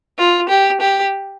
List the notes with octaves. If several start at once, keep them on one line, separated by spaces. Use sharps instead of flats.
F4
G4
G4